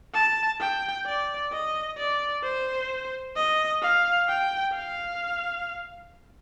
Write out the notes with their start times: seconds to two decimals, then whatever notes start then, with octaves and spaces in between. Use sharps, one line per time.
0.14 A5
0.60 G5
1.06 D5
1.52 D#5
1.97 D5
2.43 C5
3.36 D#5
3.82 F5
4.28 G5
4.74 F5